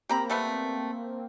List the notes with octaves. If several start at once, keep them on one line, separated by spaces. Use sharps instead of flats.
A#3 C4 G4 A#5 B5
G3 A3 B3